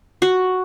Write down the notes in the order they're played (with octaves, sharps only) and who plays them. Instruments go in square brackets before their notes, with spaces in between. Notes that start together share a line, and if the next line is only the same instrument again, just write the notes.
[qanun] F#4